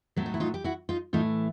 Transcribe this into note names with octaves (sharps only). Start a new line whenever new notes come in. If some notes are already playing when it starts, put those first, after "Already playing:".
A2 F#3 A3 C4
D#4
E4
D#4 F4
G4
E4 F#4
D#4 F4
A2 E3 A3 D#4 F4